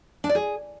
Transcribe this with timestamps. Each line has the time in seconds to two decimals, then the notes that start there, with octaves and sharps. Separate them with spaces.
0.24 D4
0.29 D5
0.35 G#4